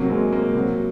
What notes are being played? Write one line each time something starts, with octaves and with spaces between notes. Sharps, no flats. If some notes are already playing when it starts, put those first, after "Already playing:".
Already playing: C3 F#3 A#3
G#3
A#3
C3 F#3